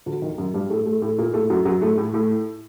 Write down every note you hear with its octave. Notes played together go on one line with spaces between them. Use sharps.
D2 D3
D#2 D#3
F#2 F#3
G2 G3
A2 A3
A2 A3
A2 A3
A#2 A#3
A2 A3
F#2 F#3
F#2 F#3
A2 A3
A2 A3
A2 A3